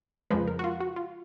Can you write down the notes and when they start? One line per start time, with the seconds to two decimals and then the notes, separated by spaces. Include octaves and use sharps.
0.31 F2 C#3 F3 G#3 B4
0.48 A#4
0.59 F#4
0.64 F4
0.81 F#4
0.96 F4